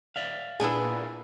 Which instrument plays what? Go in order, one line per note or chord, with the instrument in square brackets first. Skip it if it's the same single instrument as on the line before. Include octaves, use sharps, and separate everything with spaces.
[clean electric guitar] D5 E5 F5
[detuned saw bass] A#2 [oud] B3 D4 G#4 [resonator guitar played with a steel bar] E4 G#5